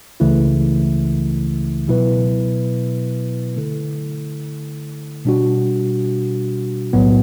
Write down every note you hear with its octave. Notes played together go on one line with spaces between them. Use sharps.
C#2 C#3 E3 A3 E4
B2 F#3 B3 E4 B4
D3 A3 E4 A4
B2 G3 D4 F#4
B1 A2 F#3 B3